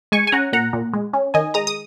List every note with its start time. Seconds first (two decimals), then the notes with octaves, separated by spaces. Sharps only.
0.12 G#3 G#5 C#6
0.27 G#5
0.32 C#4 F#5 A#5
0.53 A#2 F#5 A#5
0.73 A#2
0.94 G#3
1.13 C#4
1.34 D#3 D#5 G#5
1.54 G#3 A#5 D#6
1.67 D#6